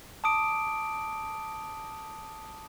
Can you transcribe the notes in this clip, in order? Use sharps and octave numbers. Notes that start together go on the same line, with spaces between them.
A5 D6 D#6 D7